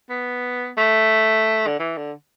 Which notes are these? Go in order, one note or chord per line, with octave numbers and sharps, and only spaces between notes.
B3
A3
D3
E3
D3